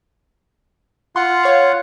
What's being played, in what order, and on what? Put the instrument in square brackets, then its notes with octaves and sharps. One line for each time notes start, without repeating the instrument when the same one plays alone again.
[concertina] F4 F#5 [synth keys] C6
[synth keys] C#5 F5